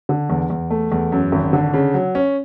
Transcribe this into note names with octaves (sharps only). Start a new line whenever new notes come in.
D3
E2
E2
A3
E2
F#2
G#1
D3
C#3
F#3
C#4